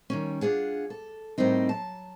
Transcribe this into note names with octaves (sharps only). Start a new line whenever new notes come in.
D#3 G3 C#4
D4 F4 G#4 F#5
A4
A2 G3 A#3 C4 D#4
F#3 A5